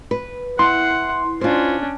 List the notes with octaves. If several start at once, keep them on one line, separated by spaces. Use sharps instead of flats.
B4
E4 F#5 C6
C#4 D4 F4 C5